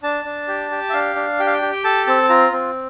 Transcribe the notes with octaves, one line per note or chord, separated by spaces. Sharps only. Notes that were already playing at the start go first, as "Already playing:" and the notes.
D4 A5
D4
G4
G4
E5
D4 F5
D4
G4 G5
F5
G5
G4
G5
A4 A5
C4 A5
F4 A#5
C4